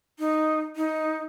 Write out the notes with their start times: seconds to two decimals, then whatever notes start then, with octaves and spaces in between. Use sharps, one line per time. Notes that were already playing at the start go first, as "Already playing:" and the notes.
0.19 D#4
0.76 D#4